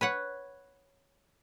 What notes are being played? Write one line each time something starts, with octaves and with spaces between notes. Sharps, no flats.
B4 C#5 F#5